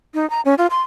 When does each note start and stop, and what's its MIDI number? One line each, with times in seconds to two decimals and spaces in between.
0.14 0.28 63
0.30 0.41 82
0.45 0.55 61
0.58 0.67 65
0.70 0.81 84